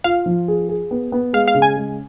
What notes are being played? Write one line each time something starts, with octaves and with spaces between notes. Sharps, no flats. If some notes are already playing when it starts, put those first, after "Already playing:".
F4 F5
F3
G#4
G#4
B3
B3
G#3 F5
F5
C#3
G#5
G#3